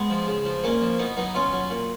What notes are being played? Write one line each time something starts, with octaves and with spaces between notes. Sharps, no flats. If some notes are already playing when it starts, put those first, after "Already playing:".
Already playing: G#3 B3
F3
C#3
F3
A#2 A#3 C#4
F3
B2 B3 D#4
F#3 B3 D#4
B2 C#4 F4
F#3
A#2